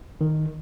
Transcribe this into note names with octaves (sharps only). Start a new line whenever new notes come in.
D#3